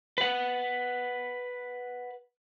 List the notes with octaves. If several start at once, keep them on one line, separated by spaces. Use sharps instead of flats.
B4 F#5